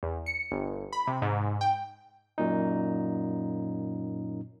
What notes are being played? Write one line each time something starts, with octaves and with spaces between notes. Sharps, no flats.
E2
C#7
G1
B5
C3
G#2
G5
F#2 A#2 D#4